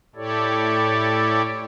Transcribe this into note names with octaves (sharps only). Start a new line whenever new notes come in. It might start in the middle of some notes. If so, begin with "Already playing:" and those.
A2 E4 G4 A4 C#5 D5